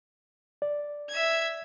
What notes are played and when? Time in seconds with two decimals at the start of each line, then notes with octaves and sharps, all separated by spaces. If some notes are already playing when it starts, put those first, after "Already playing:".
0.62 D5
1.10 E5 G#6